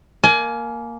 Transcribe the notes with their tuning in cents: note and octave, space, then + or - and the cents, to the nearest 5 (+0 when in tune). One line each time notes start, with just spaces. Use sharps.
A#3 +0 G#5 +30